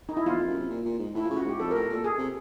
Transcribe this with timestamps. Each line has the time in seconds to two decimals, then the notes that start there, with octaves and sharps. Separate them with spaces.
0.09 D#4
0.17 E4
0.25 E2 F4
0.36 F2
0.47 F#2
0.60 C3
0.70 A#2
0.85 A#2
0.99 G#2
1.15 A2 E4
1.26 C#3 F4
1.37 F#4
1.44 G#2 G4
1.60 F2 A4
1.71 A2 A#4
1.90 A#2 A4
2.04 G#4
2.18 C3